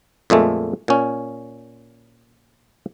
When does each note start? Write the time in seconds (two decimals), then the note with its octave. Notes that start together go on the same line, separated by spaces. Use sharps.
0.30 F2 A#2 G#3 A3
0.88 A#2 C#4